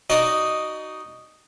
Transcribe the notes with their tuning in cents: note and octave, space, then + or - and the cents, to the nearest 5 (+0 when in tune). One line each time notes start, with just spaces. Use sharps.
D#4 -5 F#4 +20 D5 -5